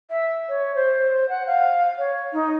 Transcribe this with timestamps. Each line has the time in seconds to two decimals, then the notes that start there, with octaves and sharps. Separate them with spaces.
0.10 E5
0.49 C#5
0.76 C5
1.29 F#5
1.47 F5
1.98 C#5
2.33 D#4